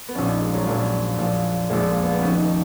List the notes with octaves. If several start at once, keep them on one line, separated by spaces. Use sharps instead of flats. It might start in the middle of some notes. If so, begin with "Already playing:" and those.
B3
A#1 A#2 F3 C#4
D#4
G#3
F#3
A#1 A#2 F3 F#3
A#1 A#2 F3
A#1 A#2 F3 G#3
A#3
B3
B3
F1 F2 D#3 C#4
D#4